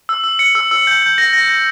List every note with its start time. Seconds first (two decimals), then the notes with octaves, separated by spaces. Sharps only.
0.09 E6
0.24 E6
0.39 C#7
0.55 E6
0.71 E6
0.87 G6
1.02 G6
1.18 A#6
1.33 A#6
1.49 A#6